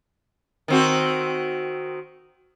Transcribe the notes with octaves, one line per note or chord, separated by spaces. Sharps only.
D#3 C4 F#4